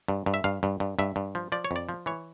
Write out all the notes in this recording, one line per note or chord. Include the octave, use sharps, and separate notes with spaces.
G2
G2
E5
G2 F5
G2
G2
G2 E5
G2
F3
F3 D5
C#5
F2 D5
F3
E3 C#5